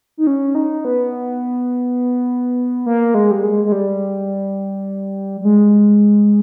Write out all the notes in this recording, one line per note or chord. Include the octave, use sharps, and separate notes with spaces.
D#4
C#4
D#4
B3
A#3
G#3
G3
G#3
G#3
G3
G3
G#3